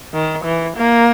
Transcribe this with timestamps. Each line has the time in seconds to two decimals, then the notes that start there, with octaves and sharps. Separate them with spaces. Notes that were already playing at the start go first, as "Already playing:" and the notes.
0.14 D#3
0.44 E3
0.76 A#3